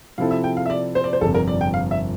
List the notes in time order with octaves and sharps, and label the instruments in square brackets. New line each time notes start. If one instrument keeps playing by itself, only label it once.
[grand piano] C3 F3 C4 E4 A4 [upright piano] F5
[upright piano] E5
G5
F5
E5
D5
C5
D5
C5
[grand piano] G1 F2 C3 [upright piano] A4
[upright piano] A#4
D5
G5
F5
E5